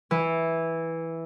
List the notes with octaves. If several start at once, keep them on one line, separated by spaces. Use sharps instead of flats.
E3